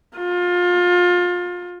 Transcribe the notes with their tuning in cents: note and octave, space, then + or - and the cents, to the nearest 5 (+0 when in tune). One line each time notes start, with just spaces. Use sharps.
F4 +25